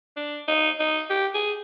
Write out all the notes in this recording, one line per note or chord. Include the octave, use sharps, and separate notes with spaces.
D4
D#4
D#4
G4
G#4